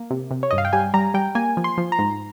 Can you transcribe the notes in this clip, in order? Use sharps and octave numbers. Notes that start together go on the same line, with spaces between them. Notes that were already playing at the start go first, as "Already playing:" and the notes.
Already playing: A#3
C3
C3
C#5
G2 D#5
F5
G5
G3 G#5
G3 A#5
G3 G5
A#3 G#5
F3
C6
F3
A#5
G#2